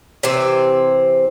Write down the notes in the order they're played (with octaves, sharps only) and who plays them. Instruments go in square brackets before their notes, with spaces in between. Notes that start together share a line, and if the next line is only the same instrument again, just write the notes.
[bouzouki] C3 E3 C4